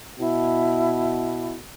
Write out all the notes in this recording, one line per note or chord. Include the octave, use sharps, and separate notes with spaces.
B2 E4